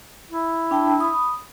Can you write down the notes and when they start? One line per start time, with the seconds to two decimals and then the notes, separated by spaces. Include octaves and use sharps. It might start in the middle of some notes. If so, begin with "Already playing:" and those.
0.31 E4
0.71 D4 G5 A5
1.00 B5 D#6